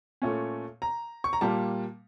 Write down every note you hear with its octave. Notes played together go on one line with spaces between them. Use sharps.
A#2 A3 C#4
A#5
C#6
A#5
A#2 G3 A#3 A5